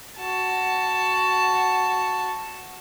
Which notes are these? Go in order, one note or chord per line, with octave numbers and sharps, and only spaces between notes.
F#4 A5